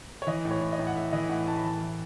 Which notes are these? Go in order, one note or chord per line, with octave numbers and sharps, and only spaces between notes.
C#5
E3 D#5
A2
C#5
A2
D#5
A2
F#5
A2 E5
E3 D#5
A2 F#5
A2 A5
B5
E3 A5
E3